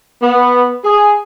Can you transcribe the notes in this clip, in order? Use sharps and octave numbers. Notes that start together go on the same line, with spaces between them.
B3
G#4